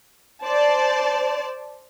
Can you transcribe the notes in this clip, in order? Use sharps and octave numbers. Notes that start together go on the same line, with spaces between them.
C5 D5 A5